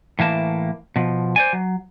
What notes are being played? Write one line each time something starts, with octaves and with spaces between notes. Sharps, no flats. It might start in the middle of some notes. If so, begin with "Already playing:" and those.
A2 E3 A#3 A5
B2 F3
C5 D5 G#5
F#3